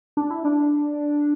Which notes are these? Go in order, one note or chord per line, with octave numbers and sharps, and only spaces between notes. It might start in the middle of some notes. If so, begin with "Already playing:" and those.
D4
E4
D4